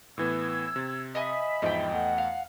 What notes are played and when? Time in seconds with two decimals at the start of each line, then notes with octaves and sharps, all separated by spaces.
0.18 A2 E3 B3 E6 G#6
0.76 C3 A6
1.15 D#5 E5 G#5 B5 D#6
1.62 E2 G#2 F3 D#5 G5
1.91 E2 A3 F#5
2.18 F5